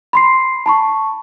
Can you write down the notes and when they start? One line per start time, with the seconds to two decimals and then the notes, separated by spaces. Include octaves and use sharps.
0.13 B5 C6 C7
0.66 A5 B5 C#6